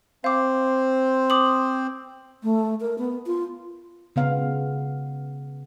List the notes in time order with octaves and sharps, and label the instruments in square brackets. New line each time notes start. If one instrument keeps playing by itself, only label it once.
[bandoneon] C4 C5 [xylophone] F5 D6
[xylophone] D6 D#6 F#7
[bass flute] A3
A#4
B3
F4
[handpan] C#3 B3 F5